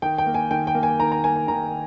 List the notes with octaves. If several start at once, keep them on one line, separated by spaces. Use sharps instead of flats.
D#3 G5
G5
A#3
G#5
D#3 G5
G5
A#3
G#5
D#3 A#5
A#5
A#3 G#5
G#5
D#3 A#5